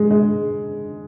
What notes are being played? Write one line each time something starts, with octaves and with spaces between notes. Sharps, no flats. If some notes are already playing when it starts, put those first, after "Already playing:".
Already playing: G#3
G#3